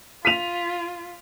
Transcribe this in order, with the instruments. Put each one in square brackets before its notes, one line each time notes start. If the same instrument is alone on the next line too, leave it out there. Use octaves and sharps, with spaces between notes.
[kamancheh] F4 [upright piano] B6 D#7 F7